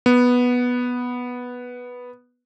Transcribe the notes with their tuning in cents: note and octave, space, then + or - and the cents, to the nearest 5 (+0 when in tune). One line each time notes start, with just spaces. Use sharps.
B3 -5